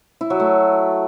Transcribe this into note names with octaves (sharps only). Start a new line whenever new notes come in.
E4
F#3
A3